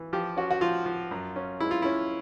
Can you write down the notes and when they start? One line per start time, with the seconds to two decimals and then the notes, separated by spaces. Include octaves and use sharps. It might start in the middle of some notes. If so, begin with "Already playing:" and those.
Already playing: E3
0.13 F3 G4
0.37 C#4 F#4
0.51 F#4
0.61 F3 F4
0.86 F3
1.11 F#2
1.36 C#4
1.60 G#3 E4
1.71 F4
1.82 C#4 E4